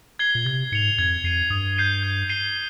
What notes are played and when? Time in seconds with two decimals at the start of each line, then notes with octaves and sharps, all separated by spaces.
0.19 G#6 C7 G7
0.35 A#2
0.45 C3 G#6
0.72 G#2 C#7 F7
0.98 F2 G#6
1.24 F2 C7 D#7
1.50 G2 D#6
1.76 G6 C7 D#7 G7
2.03 G6
2.29 C7 D#7 G7